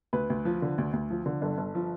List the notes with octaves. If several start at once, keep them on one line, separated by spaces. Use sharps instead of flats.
D2 B4
D2
F3
D3
D2
D2
F3
D3
G1 A4
G1
F3